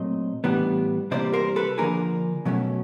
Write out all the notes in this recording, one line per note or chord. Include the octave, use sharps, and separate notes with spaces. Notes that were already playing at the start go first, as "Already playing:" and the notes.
Already playing: A#2 F#3 A3 C4 D#5
A2 E3 G3 B3 D4
C3 E3 G3 A#3 C5 D5
A#4 C5
A4 B4
D3 F3 A#3 D4 G#4 A#4
B2 F#3 A3 C#4